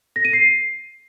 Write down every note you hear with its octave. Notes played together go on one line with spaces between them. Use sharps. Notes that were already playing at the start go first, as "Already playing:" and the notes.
A#6
D#7
C7